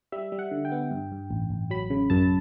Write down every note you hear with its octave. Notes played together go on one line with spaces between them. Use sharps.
G3 E5
G3
F#5
D3
G5
B3
G2
G2
A1
A1
F#3 B5
C#3
F#2 A5